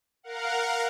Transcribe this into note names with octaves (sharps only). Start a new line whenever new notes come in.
A#4 F5 F#5